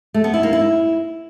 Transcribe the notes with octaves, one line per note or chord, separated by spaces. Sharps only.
A3
B3
E4
A#3
E4